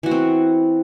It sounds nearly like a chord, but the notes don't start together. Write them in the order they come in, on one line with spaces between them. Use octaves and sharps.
E3 F#4 B3 C4